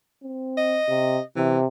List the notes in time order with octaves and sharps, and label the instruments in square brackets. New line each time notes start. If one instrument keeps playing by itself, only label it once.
[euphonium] C4
[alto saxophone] D#5
[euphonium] C3
[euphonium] C3 [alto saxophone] E3